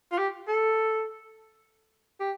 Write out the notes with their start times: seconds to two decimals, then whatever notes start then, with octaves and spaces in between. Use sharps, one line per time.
0.11 F4
0.18 G4
0.48 A4
2.20 G4